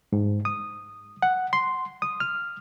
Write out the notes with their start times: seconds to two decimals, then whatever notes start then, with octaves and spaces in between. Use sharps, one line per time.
0.13 G#2
0.45 D#6
1.22 F#5
1.53 C6
2.02 D#6
2.20 F6